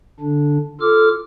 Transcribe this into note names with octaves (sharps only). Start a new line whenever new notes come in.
D3 D4
F4 A4 D6 F6